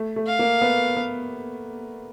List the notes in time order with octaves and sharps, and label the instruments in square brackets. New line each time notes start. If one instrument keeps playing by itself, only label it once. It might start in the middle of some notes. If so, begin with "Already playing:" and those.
Already playing: [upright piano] A3
A3
[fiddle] F5
[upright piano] A#3
B3
B3